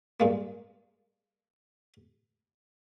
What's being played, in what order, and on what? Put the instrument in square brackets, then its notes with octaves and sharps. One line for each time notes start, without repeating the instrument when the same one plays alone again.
[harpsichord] G2 G#3 A#3